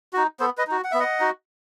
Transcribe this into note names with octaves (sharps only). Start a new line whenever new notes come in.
D#4 F#4
B3 A4 C5
B4 D#5
D#4 F#4
F#5
B3 E5
D#5 F#5
D#4 F#4